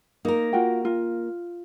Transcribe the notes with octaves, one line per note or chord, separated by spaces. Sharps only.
A#3 D#4 A#4
F4 F#4 G5
F4